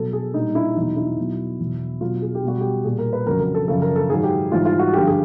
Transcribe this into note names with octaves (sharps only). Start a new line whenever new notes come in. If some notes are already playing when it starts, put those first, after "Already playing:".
Already playing: B2 F#3 A4
G#4
A#2 G3 D#4
E4
E2 B2 F#3 D#4
E4
B2 F#3
E2 B2 F#3
B2 F#3 F4
G#4
G4
B2 G3 F#4
G4
A#2 G3 G#4
A#4
B4
F2 C#3 F#3 A#4
A#4
A4
F#2 C#3 F3 A4
A#4
A4
G#2 D#3 F#3 G#4
G4
G#2 E3 G3 F4
F4
F#4
G2 D3 F3 G4
G#4